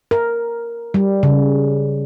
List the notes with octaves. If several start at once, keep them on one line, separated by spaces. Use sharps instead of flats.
A#4
G3
C#3